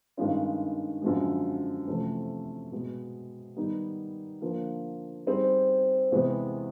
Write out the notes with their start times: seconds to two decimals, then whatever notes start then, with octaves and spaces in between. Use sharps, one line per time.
0.17 G2 D#3 G#3 C#4 F4
1.02 F#2 D3 F3 G#3
1.87 F2 C3 E3 A3 C#4
2.71 B2 G#3 B3
3.56 D#3 G3 B3 D#4
4.42 D3 F3 A#3
5.26 G3 C4 D#4 G#4
6.12 E2 C3 E3 G#3 B3